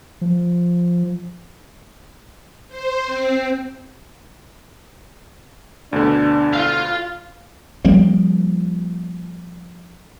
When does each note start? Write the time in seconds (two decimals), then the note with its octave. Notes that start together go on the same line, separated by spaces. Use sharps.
0.21 F3
2.68 C5
3.04 C4
5.93 D2 B2 D3 D4
6.53 F4 F5
7.85 F3 G3 A#3 C4